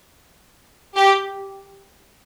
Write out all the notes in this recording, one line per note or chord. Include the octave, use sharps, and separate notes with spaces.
G4